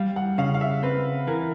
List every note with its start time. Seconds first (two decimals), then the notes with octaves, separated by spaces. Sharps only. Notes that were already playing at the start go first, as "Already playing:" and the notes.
Already playing: G3 F5
0.16 F#5
0.38 C#3 F5
0.54 F5
0.61 E5
0.83 C4 B4
1.27 E3 A#4